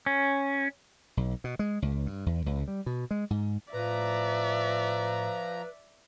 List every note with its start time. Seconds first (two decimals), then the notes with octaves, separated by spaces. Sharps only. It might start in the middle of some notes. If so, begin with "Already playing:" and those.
0.06 C#4
1.17 B1
1.44 B2
1.59 G#3
1.82 C#2
2.06 G2
2.26 E2
2.46 C#2
2.68 G3
2.86 B2
3.11 G#3
3.30 G#2
3.73 A2 F3 B4 D5 E5 A#5